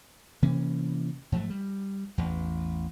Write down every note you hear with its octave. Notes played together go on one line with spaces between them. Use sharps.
C3 E3 A#3 C#4
G#2 F3 F#3 A3
G3
A1 E2